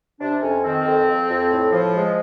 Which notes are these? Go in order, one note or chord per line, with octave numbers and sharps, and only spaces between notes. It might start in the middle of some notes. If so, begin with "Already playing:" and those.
C3 D4
F2 C#4
D#3 C4
F2
F2
F2
A2
F3
G#3